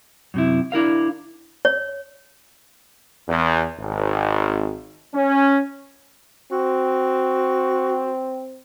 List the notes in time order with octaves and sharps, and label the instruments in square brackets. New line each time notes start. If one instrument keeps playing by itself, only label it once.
[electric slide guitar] F#2 C3 E4
D4 E4 A#4 F5
[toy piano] C#5
[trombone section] E2
G#1
C#4
[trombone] C4 [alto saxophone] F#4